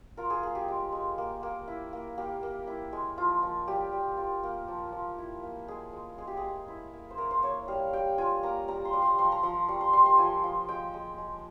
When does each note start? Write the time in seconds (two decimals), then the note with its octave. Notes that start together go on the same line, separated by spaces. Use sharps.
0.17 F4 A#4
0.30 G#4
0.43 A#3 G#4
0.55 G4
0.68 G#3
0.93 G#3
1.18 A#3
1.43 A#3
1.68 E4
1.93 A#3
2.18 A#3 G4
2.43 A#3
2.67 E4
2.93 G#3
3.18 F3 F4
3.43 F3
3.68 G3 G4
3.93 G3
4.18 F4
4.43 A#3
4.68 F3
4.92 F3
5.18 E4
5.43 A#3
5.68 G#3 G#4
5.93 G#3
6.18 G#3 G#4
6.27 G4
6.37 G#4
6.43 G#3
6.68 E4
6.93 A#3
7.10 C5
7.18 E4 A#4
7.31 C5
7.43 A#3 C#5
7.68 G3 F5
7.93 G3 G5
8.18 F4 G#5
8.43 A#3 A#5
8.68 G3 A#5
8.85 C6
8.93 G3
9.02 C6
9.18 F3 C6
9.32 A#5
9.43 F3 C6
9.68 G3 C#6
9.81 C6
9.93 G3 C6
10.06 C6
10.18 F3 G#5
10.44 F3
10.68 G#3 G5
10.94 G#3
11.18 G#3